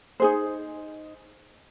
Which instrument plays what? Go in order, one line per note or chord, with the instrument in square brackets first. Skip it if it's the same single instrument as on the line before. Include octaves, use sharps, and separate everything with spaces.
[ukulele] D#4 G#4 C5